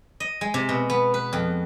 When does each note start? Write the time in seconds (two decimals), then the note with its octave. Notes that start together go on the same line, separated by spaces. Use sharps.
0.20 D#5
0.41 G#3
0.54 C3
0.69 B2
0.90 B3
1.14 B4
1.33 F2